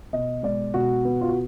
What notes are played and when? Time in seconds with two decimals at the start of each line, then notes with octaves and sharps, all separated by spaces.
0.13 B2 D#5
0.43 G#3 D5
0.74 B2 F#4
1.05 B3
1.21 F4
1.29 F#4